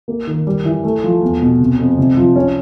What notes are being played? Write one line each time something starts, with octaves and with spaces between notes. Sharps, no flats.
A#3
D#3
G3
E3
A3
F3
E2
B2
C3
F2
C3
F3
C#4